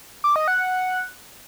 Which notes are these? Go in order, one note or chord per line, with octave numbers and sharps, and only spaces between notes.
D6
D#5
F#5